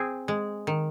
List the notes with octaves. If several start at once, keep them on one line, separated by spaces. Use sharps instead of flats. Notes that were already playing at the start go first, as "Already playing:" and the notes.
Already playing: C4 G#4
G#3
D#3